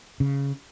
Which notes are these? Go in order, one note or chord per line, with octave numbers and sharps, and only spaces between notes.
C#3